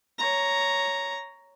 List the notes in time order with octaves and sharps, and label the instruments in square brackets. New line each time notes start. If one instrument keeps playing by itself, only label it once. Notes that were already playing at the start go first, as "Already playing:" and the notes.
[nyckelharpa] C#5 A#5